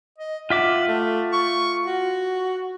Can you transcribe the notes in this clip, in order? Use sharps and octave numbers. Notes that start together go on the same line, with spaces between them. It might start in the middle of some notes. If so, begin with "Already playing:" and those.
D#5
F4 E5 F#5 D6
A3
C#6
F#4